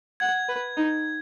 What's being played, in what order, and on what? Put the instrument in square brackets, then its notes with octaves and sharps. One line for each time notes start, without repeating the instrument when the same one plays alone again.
[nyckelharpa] F#5 [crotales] G#6
[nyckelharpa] B4
D#4